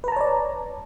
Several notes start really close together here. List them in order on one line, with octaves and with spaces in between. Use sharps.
B4 A#5 A5 C#5 D5